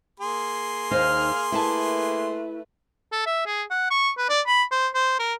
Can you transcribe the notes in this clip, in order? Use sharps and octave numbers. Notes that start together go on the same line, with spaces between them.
A#3 G#4 C6
D#2 D#4 C5 F5 F6
A3 E4 B4 E5 A5
A4
E5
G#4
F#5
C#6
B4
D5
B5
C5
C5
A#4